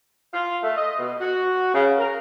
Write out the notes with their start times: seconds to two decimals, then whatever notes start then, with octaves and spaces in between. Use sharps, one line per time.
0.34 F4
0.63 A3
0.77 D#5
0.99 B2
1.20 F#4
1.75 C#3
1.98 A#4